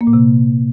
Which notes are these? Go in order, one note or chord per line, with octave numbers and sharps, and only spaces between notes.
A#3
A#2
C3